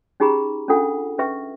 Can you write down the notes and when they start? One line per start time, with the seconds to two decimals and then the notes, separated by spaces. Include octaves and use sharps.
0.20 C#4 D#4 G4 G#4 A#5 B5
0.68 C#4 D4 F4 A4 F#5
1.19 C#4 B4 E5 C#6